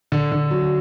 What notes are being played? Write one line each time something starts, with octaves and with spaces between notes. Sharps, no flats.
D3
D3
F#3